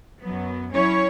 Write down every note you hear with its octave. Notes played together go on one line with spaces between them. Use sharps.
F#2 F#3 B3
F#3 C#4 E4 C#5